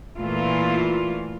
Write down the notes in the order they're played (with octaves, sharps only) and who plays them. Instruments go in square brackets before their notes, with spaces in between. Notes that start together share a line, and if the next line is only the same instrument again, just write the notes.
[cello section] A#2 E3 A3 F4